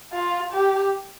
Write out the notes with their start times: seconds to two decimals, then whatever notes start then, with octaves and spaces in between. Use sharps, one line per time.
0.13 F4
0.52 G4